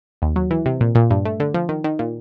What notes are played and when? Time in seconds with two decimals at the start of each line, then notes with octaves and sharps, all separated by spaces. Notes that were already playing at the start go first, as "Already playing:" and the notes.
0.22 D#2
0.36 F#3
0.51 E3
0.66 C3
0.81 A#2
0.95 A#2
1.11 G2
1.25 A3
1.40 D3
1.54 F3
1.69 D#3
1.84 D#3
1.99 A#2